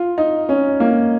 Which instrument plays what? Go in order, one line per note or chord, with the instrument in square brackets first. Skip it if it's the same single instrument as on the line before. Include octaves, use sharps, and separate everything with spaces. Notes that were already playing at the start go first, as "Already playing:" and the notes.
Already playing: [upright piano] F4
D#4
C#4
A#3